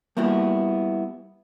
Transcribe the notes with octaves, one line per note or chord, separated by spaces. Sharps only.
G3 A#3 B3 E4 F#4